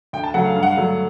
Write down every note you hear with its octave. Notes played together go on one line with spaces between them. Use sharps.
D2 G5
A5
C#3 F#3 A3 F#5
F5
G2 F5
F#5
F5
D3 F#3 A3